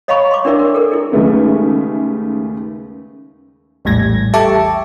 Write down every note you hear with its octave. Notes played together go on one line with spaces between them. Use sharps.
C#5 D#5 F5 A#5 B5 C#6
C6 D6
D4 E4 A#4 D5 E5
A#4
A4 A#4
E4 G#4
D#2 C#3 G#3 A3 B3
A#1 E2 A2 G3 G#6 A#6
G4 A4 E5 A5 C#6 D6